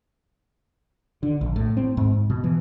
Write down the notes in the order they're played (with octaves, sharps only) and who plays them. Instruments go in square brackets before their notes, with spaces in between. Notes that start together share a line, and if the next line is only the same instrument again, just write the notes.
[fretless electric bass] D3
A#1
A2
C4
G#2
B2
E3